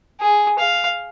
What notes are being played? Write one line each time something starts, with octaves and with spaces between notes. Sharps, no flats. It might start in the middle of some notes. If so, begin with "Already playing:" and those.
G#4
F5